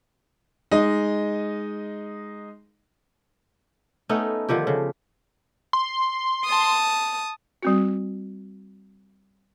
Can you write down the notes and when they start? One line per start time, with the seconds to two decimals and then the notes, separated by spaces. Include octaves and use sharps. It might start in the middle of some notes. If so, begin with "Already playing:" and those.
0.71 G#3 D#4 D#5
4.09 A3 B3 C#4 D#4
4.49 D3 D#3 F3 G4
4.67 C#3
5.73 C6
6.45 A5 D#6
7.63 G3 C4 F#4